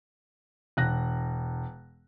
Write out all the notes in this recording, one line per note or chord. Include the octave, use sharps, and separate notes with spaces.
E1 F#6 A#6